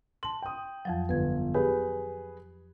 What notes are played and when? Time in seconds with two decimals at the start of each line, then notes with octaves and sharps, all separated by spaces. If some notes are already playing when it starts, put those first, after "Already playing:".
0.23 A5 C6 F#7
0.42 G5 D#6
0.85 F2 F3 F#3
1.09 G1 B4 G#6
1.54 G4 G#4 B4